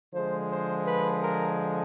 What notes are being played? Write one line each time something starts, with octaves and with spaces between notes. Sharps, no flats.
D3 F3 G#3 C5
C5
B4
A#4